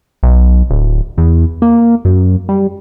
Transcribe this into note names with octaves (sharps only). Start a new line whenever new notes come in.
B1
D1
E2
A#3
F#2
G3